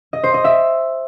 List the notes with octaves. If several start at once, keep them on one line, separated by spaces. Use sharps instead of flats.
D#5
C5
D#5
E5